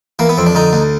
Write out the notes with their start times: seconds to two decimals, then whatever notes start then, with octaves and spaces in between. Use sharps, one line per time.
0.19 E3 A#3
0.29 B3
0.38 F2 C4
0.46 D4
0.55 D3 D#4
0.73 D2